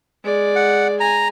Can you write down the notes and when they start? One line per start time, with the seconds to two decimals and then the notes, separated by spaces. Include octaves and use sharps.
0.24 G#3 D5
0.56 F#5
1.00 G#5 A#5